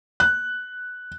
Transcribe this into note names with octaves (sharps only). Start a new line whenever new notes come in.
F#6